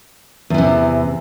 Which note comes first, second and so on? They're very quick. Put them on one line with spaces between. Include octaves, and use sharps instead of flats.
E2 E3 C3